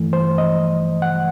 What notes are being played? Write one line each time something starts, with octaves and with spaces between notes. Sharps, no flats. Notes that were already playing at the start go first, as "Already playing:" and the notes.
Already playing: G2 E3 A3
C5
D#5
F#5